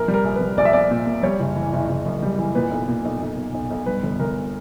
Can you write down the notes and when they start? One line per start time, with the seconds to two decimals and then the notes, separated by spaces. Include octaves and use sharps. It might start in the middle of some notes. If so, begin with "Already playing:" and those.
Already playing: A#1 A#4
0.08 G3
0.14 A#4
0.24 A#1
0.36 B4
0.41 G3
0.57 A#1 D5
0.65 E5
0.73 A#1 D5
0.90 A#2
1.06 A#2
1.23 G3 C#5
1.40 F#1
1.56 E3
1.73 F#1
1.89 F#1
2.06 F#2
2.23 G3
2.38 E3
2.55 A#2 B4
2.71 B1
2.88 A#2
3.05 B1
3.21 B1
3.37 B1
3.54 B1
3.70 B1
3.86 G2 B4
4.03 G1
4.20 G1 A#4